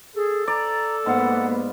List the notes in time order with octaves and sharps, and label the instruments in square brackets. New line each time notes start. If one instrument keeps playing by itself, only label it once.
[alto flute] G#4 [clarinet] A4
[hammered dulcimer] D5 [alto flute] A#5
[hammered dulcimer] G#2 F5 [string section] A#3 B3 [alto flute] F#5